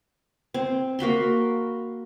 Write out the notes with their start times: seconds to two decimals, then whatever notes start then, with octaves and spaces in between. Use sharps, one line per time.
0.54 C4
0.99 A#3 F#4 B5 C6